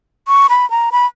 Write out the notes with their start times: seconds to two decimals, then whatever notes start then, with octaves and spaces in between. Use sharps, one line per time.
0.28 C#6
0.49 B5
0.70 A#5
0.92 B5